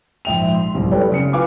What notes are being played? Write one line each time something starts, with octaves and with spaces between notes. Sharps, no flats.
A#1 G#2 E5 G5 F7
C6
D1 C2
G3 A4 B4 C#5 D5 G5
B1 C#3 C#7
E4 F4 B4 F5 G#5 D6